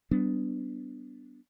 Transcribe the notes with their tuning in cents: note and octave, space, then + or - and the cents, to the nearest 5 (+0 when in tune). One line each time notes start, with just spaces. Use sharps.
G3 -30 B3 +15 D4 +0